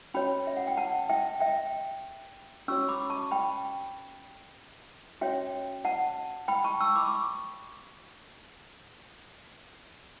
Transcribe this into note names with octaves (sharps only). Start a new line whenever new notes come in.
C#4 F#4 C#5 G5 B5
E5
F#5
G5
F#5 A5
E5 G5
E5 G5
C#4 F#4 C#5 C#6 E6
B5 D6
A5 C#6
G5 B5
C#4 F#4 C#5 E5 G5
F#5 A5
G5 B5
A5 C#6
C#6 E6
B5 D6
C#6